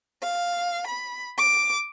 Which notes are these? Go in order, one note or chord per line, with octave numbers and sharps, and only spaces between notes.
F5
B5
D6